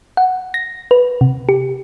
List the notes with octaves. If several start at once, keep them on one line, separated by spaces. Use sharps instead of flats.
F#5
A#6
B4
C3
G4